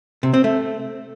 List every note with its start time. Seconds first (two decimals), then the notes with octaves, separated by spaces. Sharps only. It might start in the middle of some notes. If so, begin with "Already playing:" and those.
0.23 C3
0.34 C4
0.44 A3